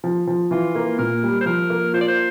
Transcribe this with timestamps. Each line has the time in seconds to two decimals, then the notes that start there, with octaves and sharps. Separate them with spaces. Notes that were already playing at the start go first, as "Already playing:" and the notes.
0.04 F3
0.27 F3
0.51 E3 F4
0.75 A#3
0.98 A#2 A#4
1.23 G3
1.41 C5
1.46 F3 A#4
1.70 A#3
1.93 F4 C5
2.01 D5
2.08 C5